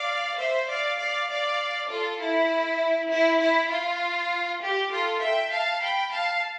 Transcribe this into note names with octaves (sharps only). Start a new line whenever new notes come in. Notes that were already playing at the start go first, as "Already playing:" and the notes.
Already playing: D5 F5
C5 E5
D5 F5
D5 F5
D5 F5
F4 A4
E4
E4
E4
F4
G4
F4 A4
E5 G5
F5 A5
G5 B5
F5 A5